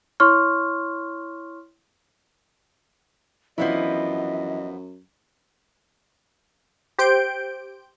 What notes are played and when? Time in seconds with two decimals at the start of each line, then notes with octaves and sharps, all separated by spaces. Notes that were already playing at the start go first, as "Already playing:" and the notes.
0.20 E4 C#5 C6 C#6 F6
3.58 F#2 E3 F3 B3 D4 E4 D#5
6.98 G4 C5 G6 D7